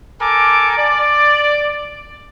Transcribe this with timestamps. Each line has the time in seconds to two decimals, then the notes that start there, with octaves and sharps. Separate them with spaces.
0.21 A4 A#4 G#5 D6
0.78 D5